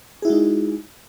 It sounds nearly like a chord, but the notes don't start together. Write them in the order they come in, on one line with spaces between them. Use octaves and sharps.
G#4 E4 F#4 G#3 D#4